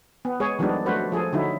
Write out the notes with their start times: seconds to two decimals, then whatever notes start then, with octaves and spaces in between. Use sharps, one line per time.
0.25 B3
0.40 G#3 G#4 C#5
0.59 D#3 F3 G3 G#3 B3 D4
0.86 F#3 A3 D4 F#4 B4 C5
1.12 F3 G#4 A4
1.33 D3 F#3 D#4 E4